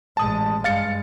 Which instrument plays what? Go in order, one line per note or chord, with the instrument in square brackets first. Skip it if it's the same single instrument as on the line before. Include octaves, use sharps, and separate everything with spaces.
[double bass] A1 G#3 [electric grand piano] A5 D#6
[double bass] G2 G#3 [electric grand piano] F5 A6 C#7